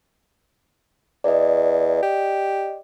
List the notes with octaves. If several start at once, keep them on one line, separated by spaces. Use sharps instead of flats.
E2 D5 D#5
G4